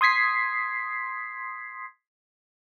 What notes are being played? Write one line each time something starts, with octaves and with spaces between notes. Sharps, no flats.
C6 D#6 G#6 B6 C7